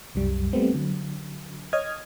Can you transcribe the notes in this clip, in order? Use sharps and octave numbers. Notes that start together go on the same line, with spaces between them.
C2 F#2 G3
G3 A3 B3 C4
D3 F#3
C#5 D#5 D#6 F6 G#6